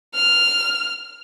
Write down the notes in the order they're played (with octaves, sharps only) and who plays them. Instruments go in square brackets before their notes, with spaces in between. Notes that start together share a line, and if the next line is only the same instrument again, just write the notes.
[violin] F6